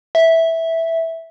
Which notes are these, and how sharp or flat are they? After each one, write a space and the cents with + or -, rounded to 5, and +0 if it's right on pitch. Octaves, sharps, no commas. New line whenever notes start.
E5 -5